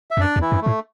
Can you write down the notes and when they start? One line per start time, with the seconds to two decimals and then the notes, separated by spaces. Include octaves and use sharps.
0.11 E5
0.17 E2
0.20 F#2 D4 D5
0.36 E2
0.41 E3 E4
0.52 F#2
0.61 A3
0.66 A2